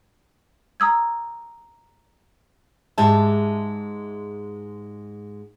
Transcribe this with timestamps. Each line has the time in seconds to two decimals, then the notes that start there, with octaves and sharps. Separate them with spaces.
0.80 A#5 D#6 E6 G#6
2.98 G#2 G#3 G4 E5 A5